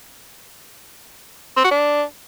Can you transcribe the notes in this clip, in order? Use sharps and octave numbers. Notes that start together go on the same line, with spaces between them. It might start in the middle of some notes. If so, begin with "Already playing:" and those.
C4
F#4
D4